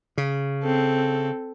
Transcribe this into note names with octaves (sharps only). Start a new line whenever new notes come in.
C#3
C4 A4